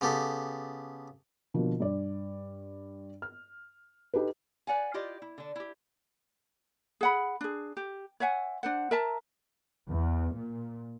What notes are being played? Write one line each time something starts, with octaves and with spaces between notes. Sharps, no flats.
C#3 B3 G4 A4
B2 D3 F3 A#3
G2 D5
F6
D#4 G4 A4 B4
B4 D5 F#5 G#5
E4 F4 G4 D5 D#5
E4
D3 D4
E4 G4
G#4 F#5 B5
D4 G#4
G4
C#5 E5 F#5 G#5
D4 C5 F#5
A#4 E5 A5 A#5
E2
A#2